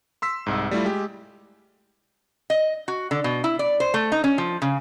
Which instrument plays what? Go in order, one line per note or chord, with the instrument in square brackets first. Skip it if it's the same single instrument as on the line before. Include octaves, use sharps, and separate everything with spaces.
[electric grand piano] C6 E6 B6
C2 G#2
G3 A3 E4 F4
G#3 G4
[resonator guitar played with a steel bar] D#5
F#4
D3
B2
E4
D5
C5
A3
D#4
C#4
F3
C#3